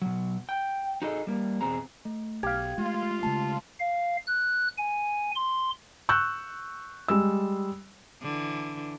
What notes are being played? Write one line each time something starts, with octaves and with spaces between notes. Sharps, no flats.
B2 F#3
G5
D#4 F#4 G#4 A4 D#5
G3 A#3
E2 B2 C4 G#4 A#5
A3
B1 G4 F5 G#6
G#3 A3 F4
C#3 G#3 A3 A5
F5
F#6
G#5
C6
C#6 E6 F#6 G6
G3 G#3 E6
D3 E3